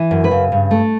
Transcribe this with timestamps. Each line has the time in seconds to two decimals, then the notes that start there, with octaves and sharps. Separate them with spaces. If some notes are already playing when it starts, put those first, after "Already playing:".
Already playing: E3
0.11 F#2
0.24 B4
0.31 C#3
0.52 G2
0.71 A3